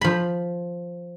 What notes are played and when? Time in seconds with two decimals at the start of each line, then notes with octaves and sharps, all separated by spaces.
0.01 F3 B5